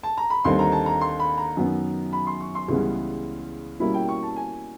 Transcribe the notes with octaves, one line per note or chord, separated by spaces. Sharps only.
A5
A#5
B5
D#2 D3 G3 C4 D#4 C6
A#5
A5
A#5
C6
B5
A#5
F#2 D#3 F#3 B3
B5
C6
C#6
C6
C#2 C#3 E3 G3 B3
B2 G3 A#3 C#4 E4 B5
G5
C#6
A5
G#5